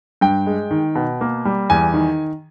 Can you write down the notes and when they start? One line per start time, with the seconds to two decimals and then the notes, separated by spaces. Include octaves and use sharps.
0.21 G2 G5
0.46 G#3
0.71 D#3
0.95 B2
1.21 A#3
1.45 G3
1.70 E2 G#5
1.93 D#3